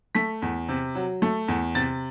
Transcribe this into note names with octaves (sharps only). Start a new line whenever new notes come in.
A3 B6
E2
C3
F#3
A3
E2
C3 A6